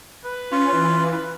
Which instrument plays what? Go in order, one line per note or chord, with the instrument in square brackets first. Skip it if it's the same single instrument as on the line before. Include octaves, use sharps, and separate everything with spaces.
[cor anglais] B4
[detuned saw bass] C#4 [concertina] F4
[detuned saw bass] E3